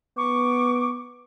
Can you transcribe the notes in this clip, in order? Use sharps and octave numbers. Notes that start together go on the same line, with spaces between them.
B3 C#6 D6